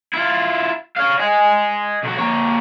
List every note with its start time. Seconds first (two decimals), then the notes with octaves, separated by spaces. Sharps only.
0.14 E4 F4
0.96 C#5 F5
1.19 D#5 G#5
2.04 B1 F#4
2.18 A#3 C#5